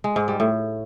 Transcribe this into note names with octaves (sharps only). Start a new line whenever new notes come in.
G#3
G#2
G3
A2